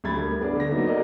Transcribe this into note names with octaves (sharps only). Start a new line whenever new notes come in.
D2 G3 A3 B5 G#6 A6
A#4
B3 D4 G#4 D5
D3 A#6
F#3 A#3 B3 D#4 E5
F#4 A4 A#4 D5 D#5